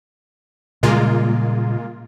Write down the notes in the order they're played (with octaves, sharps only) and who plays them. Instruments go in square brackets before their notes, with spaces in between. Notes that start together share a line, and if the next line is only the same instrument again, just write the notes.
[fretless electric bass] A#2 C#3 G3 [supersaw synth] G#3 A#3 F4